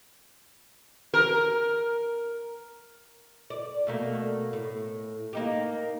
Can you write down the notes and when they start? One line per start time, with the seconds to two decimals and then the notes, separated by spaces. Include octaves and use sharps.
1.14 A#4
3.50 D5
3.87 B2 A3 A#3
4.53 A2
5.33 A#3 D#4 G4